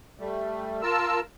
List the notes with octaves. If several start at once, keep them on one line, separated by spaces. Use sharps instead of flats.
G3 A3
F4 A#4 A5 E6